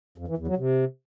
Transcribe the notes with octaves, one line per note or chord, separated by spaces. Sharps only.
F2
E3
E2
F#3
C3